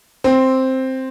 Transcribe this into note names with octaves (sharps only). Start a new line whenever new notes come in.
C4